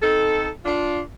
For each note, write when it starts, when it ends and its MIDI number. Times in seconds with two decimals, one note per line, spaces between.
0.02 0.48 60
0.02 0.48 63
0.02 0.48 69
0.65 1.00 62
0.65 1.00 65